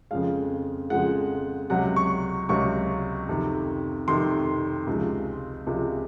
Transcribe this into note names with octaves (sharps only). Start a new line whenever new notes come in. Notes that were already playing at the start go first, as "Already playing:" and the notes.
F2 C#3 F3 G#3 F5
F2 C#3 F3 G#3 F#5
C#2 C3 F#3 F#5
C#6
C#2 C3 F#3 C#6
F2 C3 D#3
F2 C3 D#3 C6
C#2 C3 F3 G#3
C#2 C3 F3 G#3